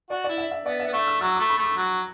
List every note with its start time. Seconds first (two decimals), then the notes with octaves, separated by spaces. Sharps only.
0.10 F#4 D5
0.24 D5
0.29 E4
0.38 E5
0.51 E5
0.66 B3 D5
0.80 E5
0.88 B3
0.93 A3 E5
1.08 E6
1.21 F#3 E6
1.36 D6
1.40 A3
1.50 B5
1.58 A3
1.64 D6
1.77 F#3